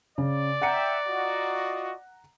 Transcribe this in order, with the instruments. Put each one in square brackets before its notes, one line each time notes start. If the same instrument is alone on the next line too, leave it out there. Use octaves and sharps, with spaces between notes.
[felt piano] C#3 [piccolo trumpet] D5
[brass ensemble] E5 G5 [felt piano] F#5 A#5 C#7
[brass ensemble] F4 F#4 D#5